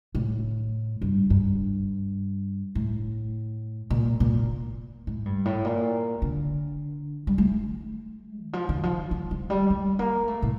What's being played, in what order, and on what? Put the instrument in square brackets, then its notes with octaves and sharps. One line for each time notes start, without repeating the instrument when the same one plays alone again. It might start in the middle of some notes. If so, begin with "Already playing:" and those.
[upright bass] A2
G2
G2
A2
A#2
A#2
A2
G2
A2
A#2
D3
G3
A3
D#3
F3
D#3
F3
F3
F3
G3
G3
A#3
A3
A2